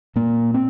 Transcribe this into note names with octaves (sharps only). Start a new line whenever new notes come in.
A#2 A#3
C4